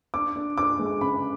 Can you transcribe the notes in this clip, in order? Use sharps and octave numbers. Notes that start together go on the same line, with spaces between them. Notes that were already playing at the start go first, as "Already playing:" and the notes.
D4 D6
D4
D4 D6
G#3
C#3 B5